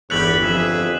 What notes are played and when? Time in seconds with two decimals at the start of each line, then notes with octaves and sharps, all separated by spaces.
0.10 G1 E2 A3 G4 C#5 B5 F#6 F#7
0.41 F2 G#4 E5